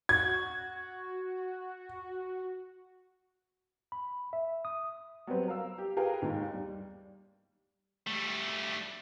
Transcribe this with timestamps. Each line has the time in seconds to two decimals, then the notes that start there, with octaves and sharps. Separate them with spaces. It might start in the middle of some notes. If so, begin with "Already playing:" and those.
0.09 F#4 G#6
3.92 B5
4.33 E5
4.65 D#6
5.27 F#3 G3 B3 C4 B4
5.48 A#4 F5 E6
5.78 G4
5.97 G4 G#4 A#4 B4 F5 G5
6.22 D#2 G#2
6.54 G3
8.07 G3 A3